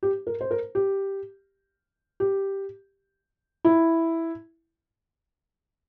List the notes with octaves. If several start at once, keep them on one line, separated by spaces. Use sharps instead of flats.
G4
A#4
C5
A#4
G4
G4
E4